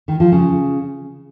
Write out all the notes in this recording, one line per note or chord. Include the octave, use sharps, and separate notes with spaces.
D#3
F3
C#3